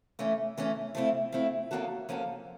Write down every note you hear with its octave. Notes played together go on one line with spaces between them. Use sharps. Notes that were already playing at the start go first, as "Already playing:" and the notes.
E3 A3 C#4
E3 A3 C#4
F3 A3 C4 E4
F3 A3 C4 E4
F3 A#3 C#4 F#4 A4
F3 A#3 C#4 F#4 A4